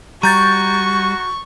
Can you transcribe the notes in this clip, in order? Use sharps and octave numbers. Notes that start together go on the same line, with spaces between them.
G3 F#4 A#5 C#6 G6 A6